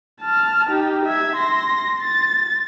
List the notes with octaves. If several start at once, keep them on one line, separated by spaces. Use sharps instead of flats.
A5 F6
D#4 G4
E5 G#6
C6 A#6
A6